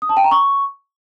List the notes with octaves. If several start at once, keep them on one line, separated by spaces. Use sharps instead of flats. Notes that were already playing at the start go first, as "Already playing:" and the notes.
D#6
A5
G5
A#5
C#6